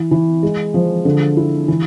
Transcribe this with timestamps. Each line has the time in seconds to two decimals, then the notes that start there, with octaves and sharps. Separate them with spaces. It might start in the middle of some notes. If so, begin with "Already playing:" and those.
Already playing: E3
0.11 E3
0.43 G#3
0.74 F3
1.05 D3
1.37 E4
1.68 E3